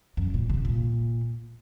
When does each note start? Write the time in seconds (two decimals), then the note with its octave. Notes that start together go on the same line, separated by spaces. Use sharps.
0.17 F#2
0.34 A#2
0.50 C3
0.65 A#2